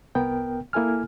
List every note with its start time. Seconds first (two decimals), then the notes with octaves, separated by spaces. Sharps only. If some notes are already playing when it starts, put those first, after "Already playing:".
0.15 C2 B3 A#4 G5
0.73 A#3 E4 A4 G#5 F6